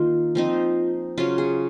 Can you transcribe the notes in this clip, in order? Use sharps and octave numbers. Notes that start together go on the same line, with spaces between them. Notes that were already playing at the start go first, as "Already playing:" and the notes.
Already playing: D#3 A#3 D#4 F4
F3 C4 D#4
C#3 F#3 C#4 F4
G#4